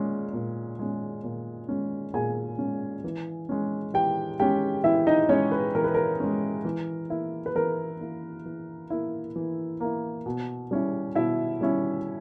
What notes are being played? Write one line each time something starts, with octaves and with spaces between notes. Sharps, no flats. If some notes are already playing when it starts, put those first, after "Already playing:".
Already playing: A#2 G#3 C#4
A#2
G#3 C#4
A#2
G#3 C#4
A#2 G#4 G#5
G#3 C#4
E3
G#3 C#4
E3 G4 G5
G#3 C#4 G4 G5
E3 E4 E5
D#4 D#5
G#3 C#4 C#5
B4
E3 A#4
B4
A#4
G#3 C#4
E3
A#3 E4
B4
E3 A#4
A#3 E4
E3
A#3 E4
E3
A#3 E4
B2
G3 C#4 E4
B2 E4 E5
G3 C#4 E4